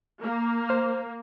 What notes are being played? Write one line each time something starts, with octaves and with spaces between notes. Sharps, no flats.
A#3
C5 F6